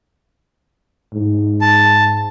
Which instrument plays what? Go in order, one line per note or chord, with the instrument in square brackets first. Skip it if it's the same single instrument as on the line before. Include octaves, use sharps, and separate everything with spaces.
[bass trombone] G#2
[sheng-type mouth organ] A5